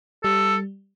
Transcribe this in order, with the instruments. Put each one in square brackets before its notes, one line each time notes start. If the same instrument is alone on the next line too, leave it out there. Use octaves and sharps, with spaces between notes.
[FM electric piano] G3 [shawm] A4